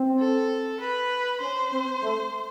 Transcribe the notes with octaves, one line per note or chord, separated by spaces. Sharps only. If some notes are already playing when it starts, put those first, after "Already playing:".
Already playing: C4
A4
B4
C#4 C5
C4
A3